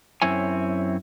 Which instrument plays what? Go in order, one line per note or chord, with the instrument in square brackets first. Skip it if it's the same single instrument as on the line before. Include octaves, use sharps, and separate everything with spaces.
[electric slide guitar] F#2 C4 E4 C#5 G#5